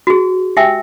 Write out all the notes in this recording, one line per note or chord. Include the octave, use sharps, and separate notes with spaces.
F#4 G#4
G4 E5 G5 G#5 E6